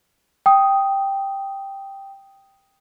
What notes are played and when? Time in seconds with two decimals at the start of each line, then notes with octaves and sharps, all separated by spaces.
0.46 G5 D#6